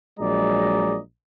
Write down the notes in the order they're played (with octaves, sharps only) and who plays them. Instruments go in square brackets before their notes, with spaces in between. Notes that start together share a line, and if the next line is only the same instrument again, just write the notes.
[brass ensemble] A#1 F#3 G#3 D5 D#5 A#5